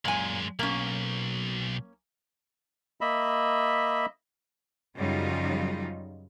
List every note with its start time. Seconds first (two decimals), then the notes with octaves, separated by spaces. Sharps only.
0.05 F#2 A#2 G#3 G#5
0.59 B1 A#3 C#4
3.01 A#3 D#5 E5 B5
4.96 F#2 C#3 F3 G3 D#4 F4